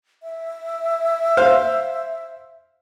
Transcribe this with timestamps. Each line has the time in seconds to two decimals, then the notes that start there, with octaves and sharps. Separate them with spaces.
0.23 E5
1.37 C5 F5